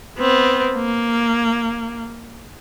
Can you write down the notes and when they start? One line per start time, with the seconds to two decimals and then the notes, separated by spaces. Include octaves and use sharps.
0.19 B3 C4
0.75 A#3